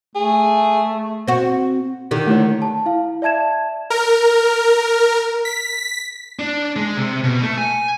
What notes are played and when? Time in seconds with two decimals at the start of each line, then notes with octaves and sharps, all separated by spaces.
0.15 A3 G#4
1.27 C4 F#4
2.11 D3 D#3 G4
2.27 A3 E4 C#5
2.62 A5
2.86 E4 F5
3.22 D5 E5 A5 G#6 E7
3.90 A#4
5.45 B6
6.39 D4
6.76 G#3
6.97 C3
7.24 B2
7.42 A3
7.58 G#5